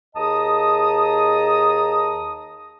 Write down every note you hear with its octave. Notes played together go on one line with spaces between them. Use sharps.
D#2 G#4 D#5 A5 A#5 D#6